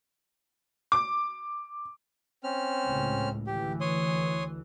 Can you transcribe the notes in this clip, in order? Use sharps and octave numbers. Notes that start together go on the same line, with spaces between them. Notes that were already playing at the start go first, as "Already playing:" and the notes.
D6
C4 C#4 F6
C#2 A2
D2 E3 G4
C#5 C6 D#6